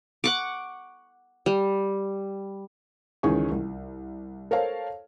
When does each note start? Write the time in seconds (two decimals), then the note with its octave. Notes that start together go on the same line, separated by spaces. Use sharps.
0.24 F#5 C#6 D6
1.46 G3
3.23 C#2 D#3 E3 C#4 G#4 C#6
3.52 C2
4.51 A4 A#4 C5 C#5 F5 A5